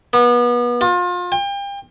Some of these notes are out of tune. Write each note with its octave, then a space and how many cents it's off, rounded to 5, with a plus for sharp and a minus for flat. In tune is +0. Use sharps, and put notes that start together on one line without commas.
B3 -30
F4 +30
G5 +35